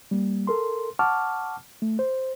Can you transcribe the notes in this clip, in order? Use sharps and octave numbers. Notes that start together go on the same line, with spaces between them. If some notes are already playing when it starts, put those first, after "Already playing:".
G3 A#3
A4 A#4 C6
F#5 A5 C#6 D6 F6
A3
C5